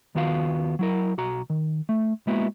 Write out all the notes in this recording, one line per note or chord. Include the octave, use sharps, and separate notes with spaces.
D#2 D#3 B3 F4 F#4 F5
F#3 E4 A#4
B1 F#4 A#5
D#3
A3
G#3 A#3 B3 E4 F#4